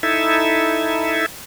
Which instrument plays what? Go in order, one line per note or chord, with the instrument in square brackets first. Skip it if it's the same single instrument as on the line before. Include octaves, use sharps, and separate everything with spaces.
[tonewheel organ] D#4 E4 A4 E5